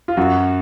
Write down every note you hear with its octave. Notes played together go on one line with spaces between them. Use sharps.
F4
F#2 F#4